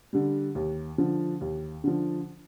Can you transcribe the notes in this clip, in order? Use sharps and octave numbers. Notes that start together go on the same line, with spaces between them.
D3 G3
D#2
D3 F3
D#2
D3 F3